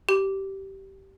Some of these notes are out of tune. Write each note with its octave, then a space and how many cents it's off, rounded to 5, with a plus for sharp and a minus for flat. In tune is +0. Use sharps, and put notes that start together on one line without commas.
G4 -15